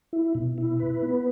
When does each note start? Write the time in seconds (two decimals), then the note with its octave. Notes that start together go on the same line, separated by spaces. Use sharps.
0.13 E4
0.35 B2
0.58 E4
0.79 B4
1.02 B3